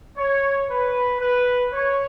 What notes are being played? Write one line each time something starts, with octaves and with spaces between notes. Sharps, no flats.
C#5
B4
B4
C#5